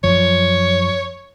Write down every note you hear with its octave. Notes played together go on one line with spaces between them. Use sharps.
F#2 F3 C#5